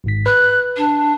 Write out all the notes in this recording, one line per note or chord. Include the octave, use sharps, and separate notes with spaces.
G#1 G#2 B6
B4 F#6
D4